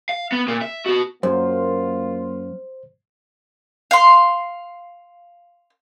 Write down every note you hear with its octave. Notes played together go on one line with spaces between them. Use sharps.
F5
B3
A#2 A#3
E5
B3 F#4
F#2 A#3 F4 C5
F5 C6